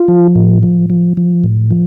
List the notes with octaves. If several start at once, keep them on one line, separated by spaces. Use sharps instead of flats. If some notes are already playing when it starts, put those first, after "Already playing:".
Already playing: F4
F3
A2
F3
F3
F3
A2
F3